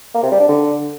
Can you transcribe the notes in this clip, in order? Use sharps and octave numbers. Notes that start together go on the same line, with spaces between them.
A#3
C3
G3
D4
D3